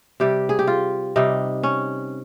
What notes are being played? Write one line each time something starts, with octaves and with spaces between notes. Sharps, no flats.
C3 G3 G4
G#4
G4
F4
C3 G3 D#4
C#4